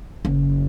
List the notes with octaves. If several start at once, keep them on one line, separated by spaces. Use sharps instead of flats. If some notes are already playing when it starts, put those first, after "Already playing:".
F#1